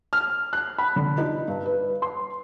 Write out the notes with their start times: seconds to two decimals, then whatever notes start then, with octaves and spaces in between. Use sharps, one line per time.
0.13 F6
0.53 F#6
0.78 B5
0.96 D3
1.18 D#4
1.48 G2
1.66 B4
2.02 C6